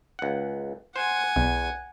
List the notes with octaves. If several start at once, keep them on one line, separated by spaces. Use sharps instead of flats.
C#2 F#5
C5 F#5 G#5
B1 E2